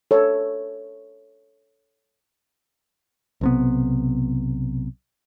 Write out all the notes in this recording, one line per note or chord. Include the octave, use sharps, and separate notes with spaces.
A4 C#5
B1 C3 B3